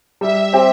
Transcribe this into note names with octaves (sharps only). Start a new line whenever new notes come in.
G3 E5
C4 G4 C5